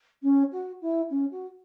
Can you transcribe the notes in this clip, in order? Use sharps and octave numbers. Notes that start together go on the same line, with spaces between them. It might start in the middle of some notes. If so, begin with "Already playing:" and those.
C#4
F#4
E4
C#4
F#4